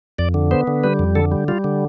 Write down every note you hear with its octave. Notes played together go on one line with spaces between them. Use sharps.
F2 D5
D3
B3 C5
D3
G3 B4
F2
D3 A4
G3
G3 F4
D3